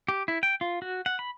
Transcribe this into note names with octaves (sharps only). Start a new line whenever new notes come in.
G4
E4
G5
F4
F#4
F#5
B5